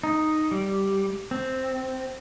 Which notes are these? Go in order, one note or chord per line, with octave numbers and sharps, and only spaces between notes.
D#4
G3
C4